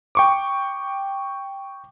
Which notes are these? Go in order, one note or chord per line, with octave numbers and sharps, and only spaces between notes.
G5 C#6 D6